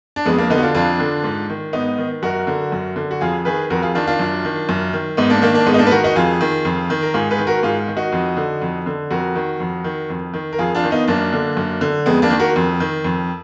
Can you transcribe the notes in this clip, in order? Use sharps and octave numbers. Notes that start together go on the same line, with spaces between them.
D4
F2 G#3 B3
A#3 D4
D3 B3 D#4
F#4
D4 F4
F2 D4 F4
D3
G#2
D#3
G#2 B3 D#4
D#3
F#2 F#4 A#4
D3
F#2
D3
F#4
F2 F4 G#4
D#3 G#4 B4
F2 F#4 A#4
F4 G#4
D#3 D4 F4
D4 F4
F#2
D#3
F#2
D#3
G#2 B3 D#4
A#3 D4
D#3 A#3 D4
A#3 D4
G#2 G#3 B3
D#4
A#3 D4
B4
D#3 F#4 A#4
D#4 F#4
F2 F4 G#4
D#3
F2
D#3
A#4
G#2 F4 G#4
G#4 B4
D#3
F#4 A#4
G#2 F4 G#4
D#3
D#4 F#4
F2
D3
F2
D3
F2 F#4 A#4
D#3
F2
D#3
F2
D#3
A#4
F2 F4 G#4
D4 F4
D#3
B3 D#4
F#2 A#3 D4
D3
F#2
D3
F2 G#3 B3
A#3 D4
D#3
F#4 A#4
F2
D#3
F2